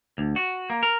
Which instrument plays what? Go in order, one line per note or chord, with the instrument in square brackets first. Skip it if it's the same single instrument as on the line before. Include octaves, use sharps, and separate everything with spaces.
[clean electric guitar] D2
F#4
A#3
A#4